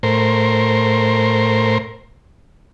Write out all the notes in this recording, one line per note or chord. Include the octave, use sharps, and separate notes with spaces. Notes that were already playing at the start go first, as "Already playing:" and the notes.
A2 A#4 C5